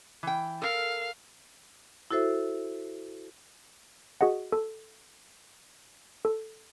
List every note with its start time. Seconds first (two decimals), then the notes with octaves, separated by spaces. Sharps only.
0.23 E3 G5
0.62 A4 A#4 F5
2.11 E4 F#4 A4 C5 E5
4.21 F#4 G#4 D#5 F#5
4.52 A4
6.25 A4